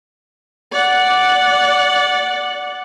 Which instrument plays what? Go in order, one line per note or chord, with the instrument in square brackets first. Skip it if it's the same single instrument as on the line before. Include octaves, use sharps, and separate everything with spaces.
[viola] D5 F#5